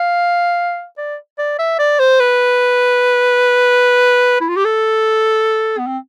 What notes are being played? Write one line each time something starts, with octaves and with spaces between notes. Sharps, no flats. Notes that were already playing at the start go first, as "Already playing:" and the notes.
Already playing: F5
D5
D5
E5
D5
C5
B4
E4
F4
G4
A4
B3
C4